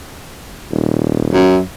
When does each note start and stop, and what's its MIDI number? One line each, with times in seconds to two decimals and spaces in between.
0.71 1.46 27
1.33 1.60 42